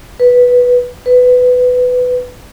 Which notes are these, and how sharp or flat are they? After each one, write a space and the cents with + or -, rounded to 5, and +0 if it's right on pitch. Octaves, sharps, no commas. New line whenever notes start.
B4 -5
B4 +15